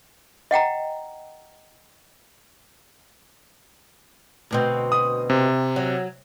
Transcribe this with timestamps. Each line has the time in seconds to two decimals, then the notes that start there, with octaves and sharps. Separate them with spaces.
0.51 D#5 F#5 G5 A#5
4.51 D2 B2 C4
4.92 D#6
5.30 C3
5.76 F#3